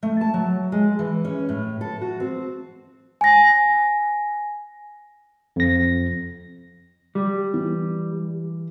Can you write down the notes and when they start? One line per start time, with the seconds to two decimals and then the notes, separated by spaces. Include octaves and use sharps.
0.03 A3
0.21 A5
0.34 F#3
0.72 G#3
0.99 E3
1.25 C#4
1.49 A2
1.81 A4
2.01 F#4
2.20 C4
3.21 G#5 A#6
5.56 F2 A#6
7.15 G3
7.54 E3